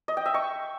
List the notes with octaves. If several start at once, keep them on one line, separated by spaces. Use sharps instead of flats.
D#5
G5
E5
C#6